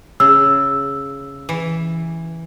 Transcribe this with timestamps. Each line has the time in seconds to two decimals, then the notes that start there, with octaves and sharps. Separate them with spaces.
0.20 C#3 E6
1.49 E3